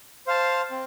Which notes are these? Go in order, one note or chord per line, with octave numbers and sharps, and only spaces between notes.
C5 F5 A5
C4